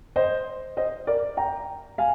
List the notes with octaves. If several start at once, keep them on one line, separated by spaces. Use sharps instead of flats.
C5 D#5
C5 D#5
A#4 D5
G5 A#5
F5 G#5